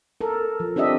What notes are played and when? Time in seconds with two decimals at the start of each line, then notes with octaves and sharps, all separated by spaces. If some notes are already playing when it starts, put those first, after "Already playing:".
0.21 A4 A#4
0.60 F3
0.76 C4 D4 G4 D#5 E5